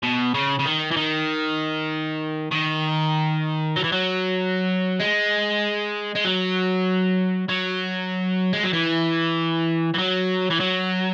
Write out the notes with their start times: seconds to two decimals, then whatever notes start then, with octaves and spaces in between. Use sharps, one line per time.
0.03 B2
0.34 C#3
0.59 C#3
0.65 D#3
0.91 E3
0.96 D#3
2.52 D#3
3.76 F#3
3.84 E3
3.92 F#3
5.00 G#3
6.16 G#3
6.25 F#3
7.49 F#3
8.53 G#3
8.63 F#3
8.73 E3
9.94 E3
9.98 F#3
10.50 E3
10.60 F#3